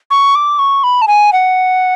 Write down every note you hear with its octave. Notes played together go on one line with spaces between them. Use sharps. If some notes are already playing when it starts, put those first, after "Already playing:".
C#6
D6
C#6
B5
A5
G#5
F#5